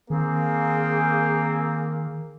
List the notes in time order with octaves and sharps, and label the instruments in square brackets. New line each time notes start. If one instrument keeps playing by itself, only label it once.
[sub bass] D#3 [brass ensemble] A#3 [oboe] C4 [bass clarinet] G#4